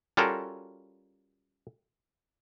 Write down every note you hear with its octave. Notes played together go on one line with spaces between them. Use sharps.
G3 C#4 F4 F#4 A4 A#4